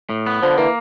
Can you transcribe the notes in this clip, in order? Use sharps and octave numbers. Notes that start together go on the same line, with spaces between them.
A2
B3
D3 F3
E3 A#3